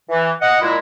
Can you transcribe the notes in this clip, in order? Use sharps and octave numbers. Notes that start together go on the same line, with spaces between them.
E3
D#5 F#5
A#2 G#3 E4